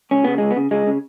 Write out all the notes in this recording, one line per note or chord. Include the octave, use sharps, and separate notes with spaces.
C#2 C#4
C#3 B3
C#2 G#3
B3
C#3
C#2 G#3
C#3